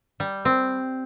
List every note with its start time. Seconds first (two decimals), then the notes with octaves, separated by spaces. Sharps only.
0.20 G3
0.45 C4